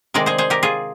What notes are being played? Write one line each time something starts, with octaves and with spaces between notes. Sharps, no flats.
C3 D#3 G#3 A#4 D5
G#4 C5
G#4 C5
G4 A#4
F4 G#4